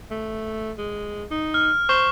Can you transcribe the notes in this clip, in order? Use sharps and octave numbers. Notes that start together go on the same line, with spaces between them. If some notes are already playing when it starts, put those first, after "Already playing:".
A3
G#3
D#4
F6
C5 C#6